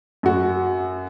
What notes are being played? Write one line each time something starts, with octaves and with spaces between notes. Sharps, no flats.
F#2 F#4